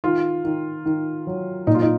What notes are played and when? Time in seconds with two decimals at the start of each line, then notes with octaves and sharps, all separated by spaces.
0.04 D#3 F4
0.45 D#3
0.86 D#3
1.27 F#3
1.67 A#2 D#4
1.75 F4
1.82 D#4